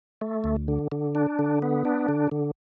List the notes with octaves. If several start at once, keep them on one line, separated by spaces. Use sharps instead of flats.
A3
D2
D3
D3
D4
D3
B3
D4
D3
D3